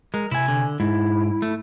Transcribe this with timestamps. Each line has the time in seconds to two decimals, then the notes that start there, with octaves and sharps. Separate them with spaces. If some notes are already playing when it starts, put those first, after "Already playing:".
0.14 G#3 A#4
0.31 C3 E4 G#5
0.48 D3
0.80 G#2 E4
1.42 A3